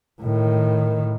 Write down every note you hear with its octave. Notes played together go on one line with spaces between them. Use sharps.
A2 D#3